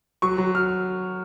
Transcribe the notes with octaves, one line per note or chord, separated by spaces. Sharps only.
F#3 C#6
F#3
F6